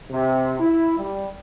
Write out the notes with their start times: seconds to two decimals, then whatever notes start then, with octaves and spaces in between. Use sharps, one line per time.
0.11 C3
0.60 E4
0.98 G3